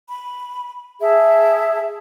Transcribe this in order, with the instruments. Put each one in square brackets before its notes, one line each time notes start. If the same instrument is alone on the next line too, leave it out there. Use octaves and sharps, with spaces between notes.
[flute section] B5
G#4 E5 A5